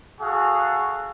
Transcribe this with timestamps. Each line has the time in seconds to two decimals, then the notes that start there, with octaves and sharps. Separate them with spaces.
0.21 F#4 G#4 A4 F5